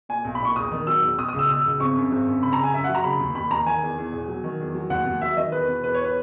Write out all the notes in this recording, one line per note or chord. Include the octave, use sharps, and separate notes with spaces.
A#2 G#5
B1
B5
A#2 C#6
E1 D#6
D#3
F#3 E6
E1
B2 D#6
D#6
C#2
E6
B2 E6
C#2
G#1 C#6
F#2
G#1
F#2
C#3 B5
A#5
C#3
G#5
F#2 E5
F#5
F#3
A#5
C#3 B5
D#2
D#2 B5
D#2 A#5
D#3 G#5
E2
E2
E1
F#3
D#3
E2
F#3
D#2 F#5
D#2
F#3 E5
D#3 D#5
E2 B4
B2
E2 B4
C#5
B4